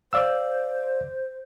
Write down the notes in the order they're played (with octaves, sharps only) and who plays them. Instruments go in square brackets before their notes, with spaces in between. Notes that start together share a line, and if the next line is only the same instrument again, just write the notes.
[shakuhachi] C5 [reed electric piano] D5 F5 E6